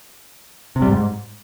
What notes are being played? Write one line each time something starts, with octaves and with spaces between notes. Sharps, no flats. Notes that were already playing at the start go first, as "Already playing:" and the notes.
C3
G3
G#2